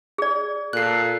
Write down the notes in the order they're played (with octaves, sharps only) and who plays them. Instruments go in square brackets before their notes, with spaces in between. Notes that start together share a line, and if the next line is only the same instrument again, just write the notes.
[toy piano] G#4 D5
[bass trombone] A#2 [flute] A4 [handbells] F#6 C7